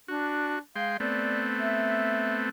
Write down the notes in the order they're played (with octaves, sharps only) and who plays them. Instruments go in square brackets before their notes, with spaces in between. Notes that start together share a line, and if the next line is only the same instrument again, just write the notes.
[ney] D4 [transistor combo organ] F#4
[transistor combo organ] G#3 G5 C6 [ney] F5
[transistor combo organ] A3 B3 C4 [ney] D5
[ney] E5